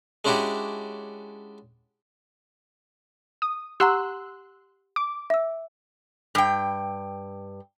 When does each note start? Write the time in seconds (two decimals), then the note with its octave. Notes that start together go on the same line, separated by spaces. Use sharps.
0.25 G#3 C#4 D4 E4 F#4 G4
3.42 D#6
3.80 G4 F#5 A#5 C6 E6 F#6
4.96 D6
5.30 E5 E6
6.35 G2 G5